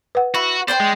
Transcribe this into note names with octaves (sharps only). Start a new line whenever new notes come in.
B4 F#5
E4 F#4
C5 D5 G5 C6
G#3